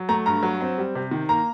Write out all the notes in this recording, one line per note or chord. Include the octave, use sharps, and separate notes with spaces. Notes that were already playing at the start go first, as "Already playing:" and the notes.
Already playing: F#3
A3 A#5
G2 A#5
F#3
C4
G3
C3
D#3
A#3 A#5